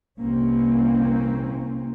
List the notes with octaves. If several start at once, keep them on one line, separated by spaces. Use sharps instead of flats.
C2 C3 E3 A#3 C4 C#4